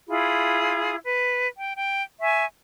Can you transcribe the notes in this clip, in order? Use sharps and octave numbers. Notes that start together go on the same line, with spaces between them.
E4 F4 G#4 B5
B4
G5
G5
E5 G#5 C#6